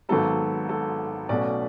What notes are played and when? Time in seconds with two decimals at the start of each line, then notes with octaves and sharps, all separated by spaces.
0.09 G#1 G#2 F#3 B3 A4
0.69 A4
1.29 B1 B2 A3 C#4 D5